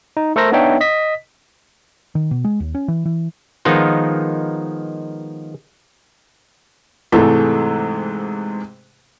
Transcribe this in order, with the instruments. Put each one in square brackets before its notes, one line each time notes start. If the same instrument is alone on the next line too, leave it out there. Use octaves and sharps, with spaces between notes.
[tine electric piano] D#4
A3 A4 A#4 C5 A#6
B3 D4 D#4 C#5 E5 G5
D#5 B6
[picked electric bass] D#3
B2
G#3
D#2
C#4
E3
E3
[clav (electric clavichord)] D#3 F3 G#3 B3 D#4 F4
[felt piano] G#2 C3 E3 G#3 A3